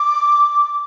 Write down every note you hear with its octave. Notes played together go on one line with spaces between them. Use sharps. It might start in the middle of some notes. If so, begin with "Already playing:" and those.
Already playing: D6